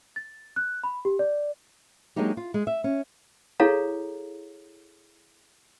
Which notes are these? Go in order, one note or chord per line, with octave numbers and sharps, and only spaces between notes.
A6
F#6
B5
G4
D5
F#3 G#3 A#3 D4 D#4 G4
F4
G#3
E5
C#4
E4 G#4 A4 C#5 F5 A#5